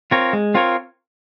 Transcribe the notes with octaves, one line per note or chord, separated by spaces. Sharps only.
C4 F4 A#4 C#5
G#3
C4 F4 A#4 C#5